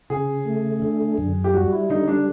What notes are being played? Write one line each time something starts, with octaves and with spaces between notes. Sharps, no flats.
C#3 G#4
A3
D3
F#2
G4
G3 F#4
E4
D3 D#4
D4